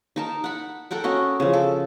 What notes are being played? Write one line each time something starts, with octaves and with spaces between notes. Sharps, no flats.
D#4 A#4 A5
F#5 B5
A4 A#4 F#5 G5
C#4 F#4 D#5
C#3 F3
A4